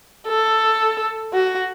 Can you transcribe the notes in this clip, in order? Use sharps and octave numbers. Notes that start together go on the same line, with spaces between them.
A4
F#4